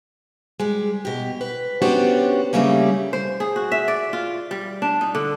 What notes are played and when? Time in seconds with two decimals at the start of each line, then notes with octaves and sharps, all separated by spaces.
0.60 G3 G#3
1.05 B2 G4
1.41 B4
1.82 B3 C#4 D4 F#4 G4 C5
2.53 C#3 F#3 G3 A3 A#3 C#4
3.13 C5
3.40 G#4
3.56 F#4
3.72 E5
3.88 D5
4.13 F4
4.51 G3
4.82 D4
5.01 D#4
5.15 D3